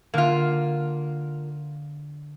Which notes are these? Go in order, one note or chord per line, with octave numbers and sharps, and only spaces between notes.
D3 A#3 F4 F6